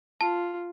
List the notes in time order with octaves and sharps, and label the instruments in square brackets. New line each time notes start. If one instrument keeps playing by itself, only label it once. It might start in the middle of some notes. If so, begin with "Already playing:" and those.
[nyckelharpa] F4 [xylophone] A5